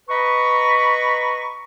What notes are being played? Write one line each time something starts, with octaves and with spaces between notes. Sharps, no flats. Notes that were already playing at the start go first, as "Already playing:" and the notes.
B4 D#5 A#5 B5 C#6